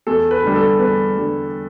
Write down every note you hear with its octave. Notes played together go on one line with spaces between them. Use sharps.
E2 A4
B4
D3 G3
A4
E2 B4
D3 G3